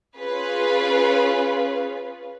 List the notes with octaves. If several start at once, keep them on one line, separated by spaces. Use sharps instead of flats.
C#4 F4 G#4 B4